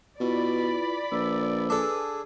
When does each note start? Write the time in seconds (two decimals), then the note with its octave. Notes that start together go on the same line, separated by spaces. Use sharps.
0.20 B2 E4 F4 B4 D5 B5
1.11 A#1 B4 D6 E6
1.70 D4 G#4 A4